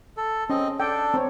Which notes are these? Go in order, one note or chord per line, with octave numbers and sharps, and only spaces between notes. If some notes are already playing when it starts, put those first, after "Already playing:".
A4
C4 C#4 D#5
D4 A4 G5
C4 C#5